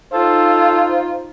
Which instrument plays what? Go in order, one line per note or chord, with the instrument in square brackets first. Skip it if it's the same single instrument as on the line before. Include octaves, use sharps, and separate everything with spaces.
[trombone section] D#4 [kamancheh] F4 [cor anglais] A4 [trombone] C5